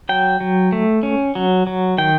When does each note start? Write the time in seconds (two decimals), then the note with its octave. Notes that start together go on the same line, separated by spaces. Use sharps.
0.09 F#3 G5
0.40 F#3
0.72 A3
1.03 C#4
1.35 F#3
1.67 F#3
1.98 D#3 G5